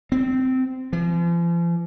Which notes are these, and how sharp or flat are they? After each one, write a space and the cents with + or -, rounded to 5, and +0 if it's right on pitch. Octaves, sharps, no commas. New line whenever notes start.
C4 -15
F3 -40